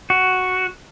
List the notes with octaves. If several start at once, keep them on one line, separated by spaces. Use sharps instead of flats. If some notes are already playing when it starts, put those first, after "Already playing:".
F#4